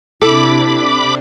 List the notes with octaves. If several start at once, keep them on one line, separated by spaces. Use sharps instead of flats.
C3 D4 E4 A4 B5 D6